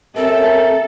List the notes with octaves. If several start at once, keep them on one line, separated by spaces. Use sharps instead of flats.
C4 C#4 G4 A4 A#4 E5